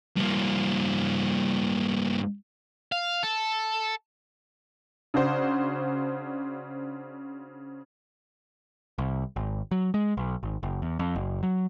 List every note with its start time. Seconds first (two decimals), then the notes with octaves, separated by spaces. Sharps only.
0.16 G2 A#3
2.92 F5
3.23 A4
5.14 C#3 D4 F#4 C5
8.98 C2
9.36 G#1
9.71 F#3
9.94 G#3
10.17 B1
10.43 G#1
10.63 F#1
10.82 E2
10.99 F2
11.16 F#1
11.43 F#3